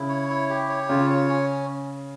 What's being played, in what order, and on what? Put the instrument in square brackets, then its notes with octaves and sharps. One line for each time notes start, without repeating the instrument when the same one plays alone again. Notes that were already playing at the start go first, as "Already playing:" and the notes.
Already playing: [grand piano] C#3 [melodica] E4
[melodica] C#5
E4
G4
C#5
[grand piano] C#3 [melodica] F4
[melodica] C#5
C#4